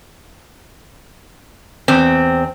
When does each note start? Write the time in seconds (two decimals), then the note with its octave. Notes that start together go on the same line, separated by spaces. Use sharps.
1.88 E2 C4